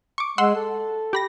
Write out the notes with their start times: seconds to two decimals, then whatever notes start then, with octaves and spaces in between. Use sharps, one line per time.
0.18 C#6 D6
0.38 G#3 F#5 C6 E6
0.55 A4
1.13 G4 B5 A#6